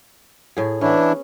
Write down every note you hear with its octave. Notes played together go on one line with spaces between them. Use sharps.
A2 G#4
E3 B3 C#4 D4 E4